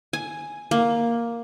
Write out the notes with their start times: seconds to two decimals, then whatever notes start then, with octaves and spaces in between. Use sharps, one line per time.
0.13 G#5
0.71 A#3